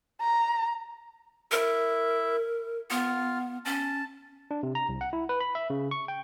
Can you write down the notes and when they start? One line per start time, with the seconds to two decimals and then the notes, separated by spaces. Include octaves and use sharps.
0.22 A#5
1.52 E4 A#4 E5
2.91 B3 F4 F5
3.65 C#4 A5
4.51 D4
4.63 C3
4.75 A#5
4.89 C2
5.01 F#5
5.13 E4
5.29 B4
5.41 B5
5.55 E5
5.70 C#3
5.91 C#6
6.08 G5